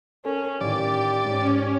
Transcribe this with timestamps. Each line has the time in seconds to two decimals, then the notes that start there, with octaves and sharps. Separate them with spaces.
0.25 C#4 A4 A#4
0.61 A1 D#3 G4 D5
1.25 G#2 C#4